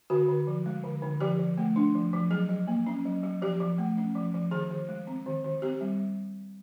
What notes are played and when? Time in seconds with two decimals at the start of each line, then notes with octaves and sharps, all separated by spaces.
0.10 D3 F#4
0.28 D3
0.47 F3
0.66 G#3
0.84 D3
1.02 D3
1.20 F3 G4
1.39 F3
1.58 A3
1.76 D4
1.95 F3
2.13 F3
2.31 F#3 G#4
2.49 F#3
2.67 A#3
2.87 C#4
3.05 F#3
3.23 F#3
3.42 F3 G4
3.60 F3
3.78 A3
3.97 C#4
4.15 F3
4.34 F3
4.51 D#3 G#4
4.71 D#3
4.89 G#3
5.07 C4
5.26 D#3
5.44 D#3
5.62 C4 G4
5.81 G3